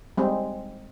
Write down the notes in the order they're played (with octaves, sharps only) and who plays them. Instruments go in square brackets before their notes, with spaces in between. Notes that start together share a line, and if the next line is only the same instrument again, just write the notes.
[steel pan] G3 G#3 C4